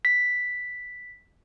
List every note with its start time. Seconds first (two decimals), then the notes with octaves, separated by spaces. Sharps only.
0.05 B6